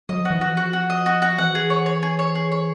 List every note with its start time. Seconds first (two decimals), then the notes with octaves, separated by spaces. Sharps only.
0.09 F#3 D#5
0.20 F3 F#4
0.30 E3
0.41 F3 F#4
0.57 F#4
0.73 F#4
0.90 D#5
1.06 F#4
1.22 F#4
1.38 E3 F#5
1.55 G#4
1.70 C#5
1.86 C#5
2.03 G#4
2.19 C#5
2.35 G#4
2.52 C#5